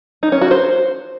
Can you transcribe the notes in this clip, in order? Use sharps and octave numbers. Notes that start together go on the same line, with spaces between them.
D#4
C#4
F#4
C5